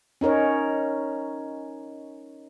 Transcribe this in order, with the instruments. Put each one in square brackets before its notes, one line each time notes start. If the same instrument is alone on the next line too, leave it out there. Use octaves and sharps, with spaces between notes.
[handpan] C#4 D#4 A#4 C#5